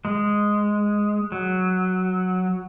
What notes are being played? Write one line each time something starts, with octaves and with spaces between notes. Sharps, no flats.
G#3
F#3